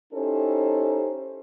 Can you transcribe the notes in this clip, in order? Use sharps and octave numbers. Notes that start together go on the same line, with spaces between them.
C#4 D#4 E4 G4 A4 C5